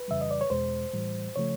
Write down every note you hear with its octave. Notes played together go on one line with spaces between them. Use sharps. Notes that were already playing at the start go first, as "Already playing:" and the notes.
Already playing: B4
F2 C#3 E3 G3 E5
D#5
D5
C#5
E2 B2 G#3 C5
A2 E3 G3
C#3 F3 A3 C#5